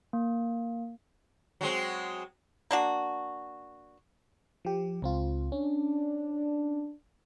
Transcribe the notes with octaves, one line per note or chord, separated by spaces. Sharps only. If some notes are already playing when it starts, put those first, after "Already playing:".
A#3
F#3 G#3 C4
A#3 D4 F#4
F3 G4
C#2 C4 F4
C#4 D4